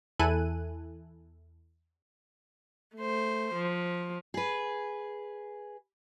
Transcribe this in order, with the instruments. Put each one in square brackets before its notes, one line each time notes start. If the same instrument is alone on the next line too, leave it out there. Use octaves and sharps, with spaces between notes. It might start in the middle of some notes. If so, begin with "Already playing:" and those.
[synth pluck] E2 E4 A4 G#5 F#6 D#7
[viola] A3 C5
F3
[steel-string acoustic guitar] G#4 B4